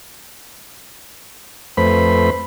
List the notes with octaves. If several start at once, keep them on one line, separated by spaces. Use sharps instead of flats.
F2 A3 B4 C5 B5